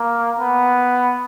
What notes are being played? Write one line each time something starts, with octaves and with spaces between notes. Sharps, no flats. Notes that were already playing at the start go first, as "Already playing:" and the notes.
Already playing: A#3
B3